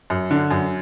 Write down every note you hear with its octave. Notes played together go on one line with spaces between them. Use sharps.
F#2
D3
F#2